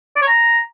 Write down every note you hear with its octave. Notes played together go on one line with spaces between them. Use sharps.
D5
C#5
A#5